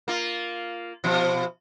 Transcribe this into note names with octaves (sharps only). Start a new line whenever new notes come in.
A#3 F4
B2 F3